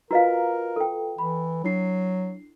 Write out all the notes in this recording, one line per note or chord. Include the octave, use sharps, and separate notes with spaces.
F4 F#4 A#4 B4 D#5 F5 A#5
A4 G5
E3 B5
F#3 D4 E4 C7